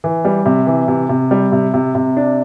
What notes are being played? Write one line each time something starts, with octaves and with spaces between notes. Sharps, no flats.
E3
G3
C3
E3
C3
C3
G3
C3
C3
C3
D4